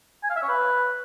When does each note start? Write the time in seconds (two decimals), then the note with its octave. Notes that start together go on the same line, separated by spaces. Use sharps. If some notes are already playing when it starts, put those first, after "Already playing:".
0.24 G#5
0.30 F5
0.36 E5
0.42 C#5
0.48 B4